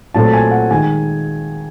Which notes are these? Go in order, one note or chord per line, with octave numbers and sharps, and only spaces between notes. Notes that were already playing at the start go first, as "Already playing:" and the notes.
A#2 F#3 A3 C4 A5
G#5
F#5
D#3 G#3 G#5